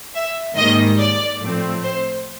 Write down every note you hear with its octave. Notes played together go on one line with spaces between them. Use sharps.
E5
G#2 D#3 G3 A#3 D#5
D5
A2 F3 A3 C4
C5